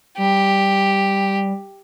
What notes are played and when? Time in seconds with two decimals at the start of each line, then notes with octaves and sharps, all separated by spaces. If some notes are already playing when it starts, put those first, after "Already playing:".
0.18 G3 G4